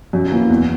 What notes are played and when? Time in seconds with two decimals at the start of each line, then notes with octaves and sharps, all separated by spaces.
0.13 F#2
0.32 E3 A#3 E4
0.49 E2